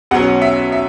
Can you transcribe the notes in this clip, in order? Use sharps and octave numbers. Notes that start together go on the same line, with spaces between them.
B1 B2 F#3 C#4 F#5
E5
E5